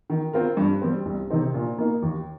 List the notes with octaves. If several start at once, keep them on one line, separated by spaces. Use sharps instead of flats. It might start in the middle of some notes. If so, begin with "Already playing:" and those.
D#3
C4 F4 A#4
G2
G3 C4
C2
C3 D#3 C4 D#4
A#2
A#3 D#4
D#2